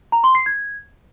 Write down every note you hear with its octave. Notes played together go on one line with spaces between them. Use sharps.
A#5
C6
C7
G#6